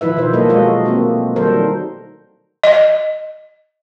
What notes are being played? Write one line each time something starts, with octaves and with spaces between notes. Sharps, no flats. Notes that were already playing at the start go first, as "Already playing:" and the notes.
D#3 F3 E4 B4 E5
B2 F3 C5
F3 F#3 A#3 A4 D#5
G#3 A3 F4 F#4 D#5
A#3 C4
D#3 F#3 G3 A4 A#4 C5
D#5